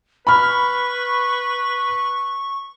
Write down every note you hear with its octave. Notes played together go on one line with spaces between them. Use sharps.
B4 B5 C#6 F6